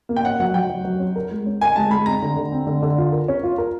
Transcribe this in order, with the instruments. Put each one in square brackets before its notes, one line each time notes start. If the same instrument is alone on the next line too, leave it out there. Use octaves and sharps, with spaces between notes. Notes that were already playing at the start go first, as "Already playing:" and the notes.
[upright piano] A#3
[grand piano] G5
[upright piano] C#4 [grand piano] F#5
[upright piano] F#3 [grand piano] F#5
[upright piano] F#3 [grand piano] G5
[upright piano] F#3
F#3
C#4
A#4
G#3
C#4
[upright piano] A#4 [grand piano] G#5
[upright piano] G#3 [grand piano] A5
[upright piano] G#3 [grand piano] B5
[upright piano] C4 [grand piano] A#5
[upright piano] D3
D3
C4
D3
D3
F4
A#4
C#4
F4
A#4